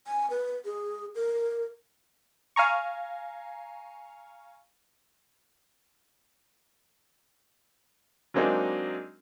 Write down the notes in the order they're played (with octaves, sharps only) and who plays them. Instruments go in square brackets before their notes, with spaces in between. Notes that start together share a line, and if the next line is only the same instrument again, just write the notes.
[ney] G#5
B4
G#4
A#4
[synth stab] F5 G#5 A#5 C#6
[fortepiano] F#3 G#3 A#3 C4 D4 D#4